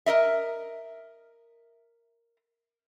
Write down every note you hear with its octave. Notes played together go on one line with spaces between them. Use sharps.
A#4 B4 D#5 E5